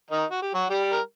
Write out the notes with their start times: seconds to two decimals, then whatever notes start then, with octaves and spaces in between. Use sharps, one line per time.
0.10 D#3 D#4
0.31 F#4
0.42 G4
0.54 F#3 F#4
0.70 G3 G4
0.92 A#4